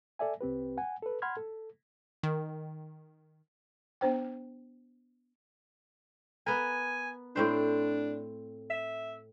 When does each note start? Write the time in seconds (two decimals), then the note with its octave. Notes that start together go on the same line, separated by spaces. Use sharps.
0.19 A4 D5 E5 G#5
0.41 C2 C4 G4 B4
0.78 F#5 G#5
1.02 A4 B4
1.22 F#5 B5 C6 F6 G#6
1.37 A4
2.23 D#3
4.01 B3 D4 C5 G5
6.47 B3 A#4 G#5
7.36 A2 C4 D4 C5
8.70 E5